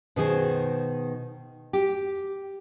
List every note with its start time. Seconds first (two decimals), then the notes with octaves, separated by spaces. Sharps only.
0.16 B2 D#3 G#4 C5
1.73 G4